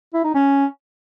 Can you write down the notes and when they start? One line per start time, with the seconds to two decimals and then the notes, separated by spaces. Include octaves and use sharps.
0.14 E4
0.24 D#4
0.34 C#4